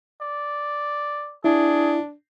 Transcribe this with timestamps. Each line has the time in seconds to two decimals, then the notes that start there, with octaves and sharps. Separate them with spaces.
0.21 D5
1.44 D4 E4 G#4